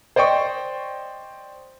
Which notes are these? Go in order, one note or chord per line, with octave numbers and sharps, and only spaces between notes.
C5 D5 D#5 G5 C#6